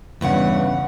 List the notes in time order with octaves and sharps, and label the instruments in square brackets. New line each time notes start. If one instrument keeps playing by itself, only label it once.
[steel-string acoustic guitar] E2 G2 C#3 F#5